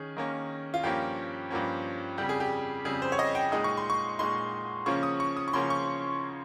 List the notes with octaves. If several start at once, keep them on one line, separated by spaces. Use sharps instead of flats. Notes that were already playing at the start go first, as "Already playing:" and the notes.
Already playing: D#3 C#4 G#4
D#3 A#3 C#4
F4
G2 F3 A#3 C#4 G4
G2 F3 A#3 C#4
F2 C#3 G3 G4
G#4
G4
F2 C#3 G3 G#4
C5
C#5
D#5
G5
A#2 G#3 D#4 D#6
C#6
C6
C#6
A#2 G#3 D#4 C6
C#3 F3 A#3 C#4 C#6
D#6
C#6
D#6
C#6
C#3 F3 A#3 C#4 C6
C#6